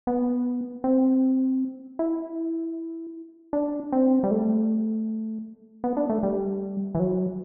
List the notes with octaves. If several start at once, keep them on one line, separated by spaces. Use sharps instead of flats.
B3
C4
E4
D4
C4
G3
A3
B3
D4
A3
G3
E3
F#3